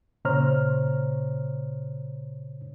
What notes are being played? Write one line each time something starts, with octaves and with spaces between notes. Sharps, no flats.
A#2 C#3 C5 C#5 A#5 F6